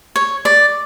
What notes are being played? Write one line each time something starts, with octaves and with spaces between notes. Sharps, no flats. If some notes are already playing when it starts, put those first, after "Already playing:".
C#5
D5